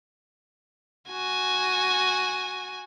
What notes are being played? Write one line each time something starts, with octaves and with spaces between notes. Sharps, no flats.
F#4 G#5